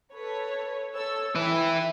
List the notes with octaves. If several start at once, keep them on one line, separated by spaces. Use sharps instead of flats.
A4 B4 C#5
A4 C#5 E6
E3 E4 E5 G5